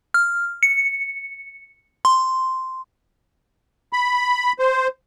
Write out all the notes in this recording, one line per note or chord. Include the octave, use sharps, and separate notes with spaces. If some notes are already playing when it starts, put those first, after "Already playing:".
F6
C#7
C6
B5
C5